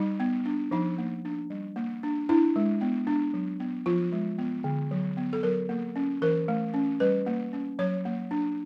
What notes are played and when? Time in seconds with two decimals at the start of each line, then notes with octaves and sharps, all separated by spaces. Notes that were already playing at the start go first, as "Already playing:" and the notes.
Already playing: G3 D#4
0.20 B3
0.46 D4
0.71 F3 D#4
0.98 A#3
1.25 D4
1.50 G3
1.76 A#3
2.03 D4
2.29 D4 E4
2.56 G#3
2.81 B3
3.07 D4
3.34 F#3
3.60 B3
3.86 F3 F4
4.12 G#3
4.38 B3
4.64 D3
4.91 F#3
5.17 B3
5.33 A4
5.43 F#3 A#4
5.69 A#3
5.96 C#4
6.22 E3 A#4
6.48 A3
6.74 C#4
7.00 G3 B4
7.26 A#3
7.53 C#4
7.79 F#3 C#5
8.05 A#3
8.31 D4